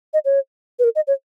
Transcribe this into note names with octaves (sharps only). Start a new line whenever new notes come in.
D#5
C#5
B4
A#4
D#5
C#5